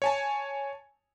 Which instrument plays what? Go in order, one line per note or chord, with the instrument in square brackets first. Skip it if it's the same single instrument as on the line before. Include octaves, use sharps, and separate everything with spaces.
[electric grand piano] C#5 G#5 A5